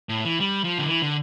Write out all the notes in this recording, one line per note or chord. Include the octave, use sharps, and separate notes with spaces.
A2
E3
G3
F3
D3
E3
D3